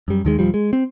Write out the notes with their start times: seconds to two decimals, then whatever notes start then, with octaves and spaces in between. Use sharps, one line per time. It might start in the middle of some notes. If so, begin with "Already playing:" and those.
0.08 F#2 G3
0.25 D#2 D#3 G#3
0.39 D#1 A#1 F3 G3
0.54 G#3
0.73 C4